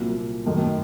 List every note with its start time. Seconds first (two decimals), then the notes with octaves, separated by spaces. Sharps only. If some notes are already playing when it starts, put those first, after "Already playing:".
Already playing: C2 A#2 F#3 A#3
0.46 F#2 D#3 A3